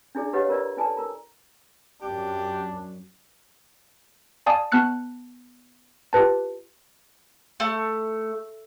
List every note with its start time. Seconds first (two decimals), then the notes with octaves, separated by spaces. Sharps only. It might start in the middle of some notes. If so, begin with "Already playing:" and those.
0.15 D4 E4 G#4 D5
0.33 G4 B4 C#5 D#5 F5 F#5
0.49 F4 A#4 B4 D5 A#5
0.77 E4 A4 B4 D5 G#5 A5
0.97 A#4 A#5
2.02 F#2 D4 G4
4.46 D5 F5 G#5 A5 D#6
4.72 B3 A5 F6 F#6 C#7
6.13 F4 G4 B4 A5
7.60 A3